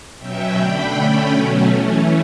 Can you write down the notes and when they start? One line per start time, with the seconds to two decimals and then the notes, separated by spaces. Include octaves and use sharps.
0.19 B2 F#3 C#4 E5 G5
0.56 D3 A3 D4 G5 B5
0.94 D3 A3 C#4 G5 B5
1.32 B2 F#3 A3 C#4
1.70 E3 A3 C#4